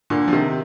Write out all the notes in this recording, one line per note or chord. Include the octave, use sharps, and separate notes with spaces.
A#2 D3
F3
C3 D#3